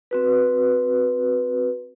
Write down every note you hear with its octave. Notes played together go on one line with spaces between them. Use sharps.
C4 F#4 B4